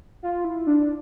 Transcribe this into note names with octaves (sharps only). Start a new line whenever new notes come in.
F4
E4
D4